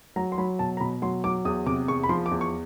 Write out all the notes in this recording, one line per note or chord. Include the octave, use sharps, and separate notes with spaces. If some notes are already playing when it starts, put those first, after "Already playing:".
F#3 A#5
C6
F#3 B5
B2 A5
A#5
B2 B5
F#3 C6
F#3 D6
E2 D#6
C3 D6
E2 C#6
B5
F3 C6
D6
E2
C#6